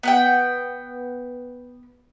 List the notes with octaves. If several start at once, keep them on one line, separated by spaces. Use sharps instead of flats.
B3 F#5 G5